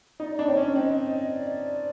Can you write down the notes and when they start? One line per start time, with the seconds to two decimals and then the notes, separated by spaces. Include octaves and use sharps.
0.20 D#4 D5
0.34 D4 D5
0.47 C4 C#5
0.57 C#4
0.62 D5
0.75 C4 D#5
1.32 D5